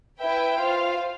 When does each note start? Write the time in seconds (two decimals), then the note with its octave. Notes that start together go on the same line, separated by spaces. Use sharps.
0.20 E4 B4 E5 G5
0.58 F4 C5 F5